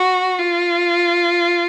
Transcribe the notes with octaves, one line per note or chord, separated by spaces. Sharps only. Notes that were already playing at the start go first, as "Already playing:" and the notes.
Already playing: F#4
F4